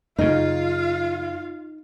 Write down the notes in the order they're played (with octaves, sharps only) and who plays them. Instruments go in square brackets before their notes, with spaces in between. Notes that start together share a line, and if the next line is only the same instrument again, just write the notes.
[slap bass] F#2 C#3 [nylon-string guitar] D#4 [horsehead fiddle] F4 F5